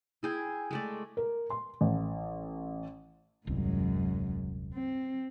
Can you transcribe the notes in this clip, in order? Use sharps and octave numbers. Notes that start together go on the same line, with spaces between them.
E4 G#4 G5
G#3 A3 D5
A#4
C6
A1
D#1 C2 F#2 G#3
C4